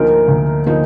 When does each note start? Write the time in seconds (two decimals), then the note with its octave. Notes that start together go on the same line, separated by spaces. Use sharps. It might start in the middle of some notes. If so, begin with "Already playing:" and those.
Already playing: D2 D3 F3 A#3 D#4 A#4
0.28 D2
0.66 D3 F3 A#3 D#4